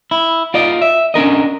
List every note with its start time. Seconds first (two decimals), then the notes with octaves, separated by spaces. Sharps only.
0.11 E4
0.54 F4 D5 D#5
0.82 E5
1.14 C#4 D4 A#4 D#5